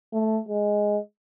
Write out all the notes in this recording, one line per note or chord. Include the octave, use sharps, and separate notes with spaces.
A3
G#3